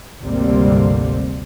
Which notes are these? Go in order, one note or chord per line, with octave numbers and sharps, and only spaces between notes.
G#1 D2 C3 G3 A#3 C4